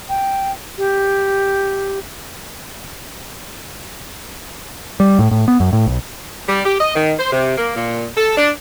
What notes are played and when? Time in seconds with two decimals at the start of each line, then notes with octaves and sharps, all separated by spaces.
0.09 G5
0.78 G4
5.00 G3
5.19 A2
5.31 A2
5.48 B3
5.60 F#2
5.73 A2
5.86 B1
6.48 G3
6.66 G4
6.80 D#5
6.95 D#3
7.19 C5
7.32 C3
7.58 A#3
7.76 A#2
8.17 A4
8.38 D4